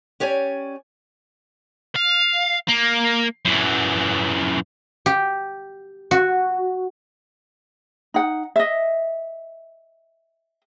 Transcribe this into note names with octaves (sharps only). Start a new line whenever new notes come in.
C#4 G4 C#5 D5 G#5
F5
A#3
F#2 E3
G4
F#4
D#4 F#5
D#5 E5